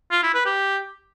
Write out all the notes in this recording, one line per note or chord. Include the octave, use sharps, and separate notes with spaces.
F4
E4
B4
G4